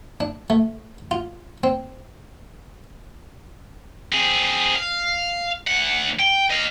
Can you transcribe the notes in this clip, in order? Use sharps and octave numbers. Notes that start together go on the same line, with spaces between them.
D4
A3
F4
C4
C4 G#4
F5
D2 F#5
G5
D#5 F5